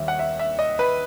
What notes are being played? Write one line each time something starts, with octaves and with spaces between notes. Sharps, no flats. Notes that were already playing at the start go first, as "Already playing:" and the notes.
Already playing: D#2 D#3 G3 E5
F#5
E5
E5
D#5
B4